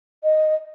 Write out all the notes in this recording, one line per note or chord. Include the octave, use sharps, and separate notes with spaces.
D#5